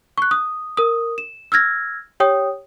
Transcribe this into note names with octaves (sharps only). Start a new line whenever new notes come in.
C#6 F#6
D#6
A#4 D#6
E7
E6 F6 G#6 A#6
G4 C#5 G5 D#6